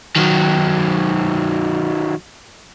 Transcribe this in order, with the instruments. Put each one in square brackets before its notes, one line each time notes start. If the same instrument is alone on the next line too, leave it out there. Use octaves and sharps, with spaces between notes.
[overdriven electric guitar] D#3 F#3